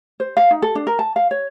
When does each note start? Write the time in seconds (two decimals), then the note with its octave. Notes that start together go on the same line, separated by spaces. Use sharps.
0.20 C5
0.37 F5
0.51 D#4
0.62 A4
0.75 D4
0.87 A#4
0.99 A5
1.16 F5
1.31 C#5